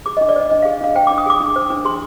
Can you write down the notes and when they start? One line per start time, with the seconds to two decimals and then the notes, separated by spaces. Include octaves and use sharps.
0.06 G#4 D6
0.17 D#5
0.21 D4
0.29 D5
0.36 C5 D#5
0.51 D4 D#5
0.62 F5
0.65 G#4
0.81 D4 F5
0.95 C5 G5
1.07 D6
1.11 D4
1.18 D#6
1.26 G#4 D6
1.41 D4
1.56 C5
1.70 D4
1.85 G#4 C6